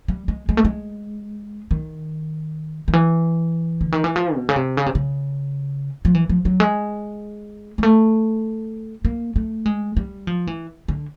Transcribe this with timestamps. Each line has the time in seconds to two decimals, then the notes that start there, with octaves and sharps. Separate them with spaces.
0.08 G3
0.28 G#3
0.49 G#3
0.57 A3
0.65 G#3
1.71 D#3
2.88 D#3
2.93 E3
3.81 D3
3.92 D#3
4.04 E3
4.16 F3
4.36 B2
4.49 C#3
4.56 C3
4.77 C#3
4.86 C3
4.95 C#3
6.05 F3
6.15 E3
6.29 F3
6.45 F#3
6.60 G#3
7.78 G#3
7.83 A3
9.05 A#3
9.36 A3
9.66 G#3
9.97 G3
10.27 F3
10.47 E3
10.88 D3